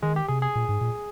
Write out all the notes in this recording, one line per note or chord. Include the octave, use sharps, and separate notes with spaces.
D#3 G#3
G4
C3 G#4
G#4
A#2
G#2
A#2